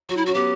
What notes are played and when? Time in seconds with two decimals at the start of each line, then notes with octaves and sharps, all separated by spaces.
0.09 F#3 F#4
0.17 E4
0.26 C#4 F#4
0.34 B3 G4